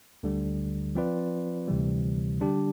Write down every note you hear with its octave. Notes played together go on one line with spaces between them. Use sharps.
D2 D3 G3
F3 C4 F4 B4 D5
D2 C3 E3 G3
D3 G3 D4 G4